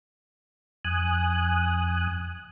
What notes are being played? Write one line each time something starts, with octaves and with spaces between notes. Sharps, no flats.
F2 G#5 D#6 F#6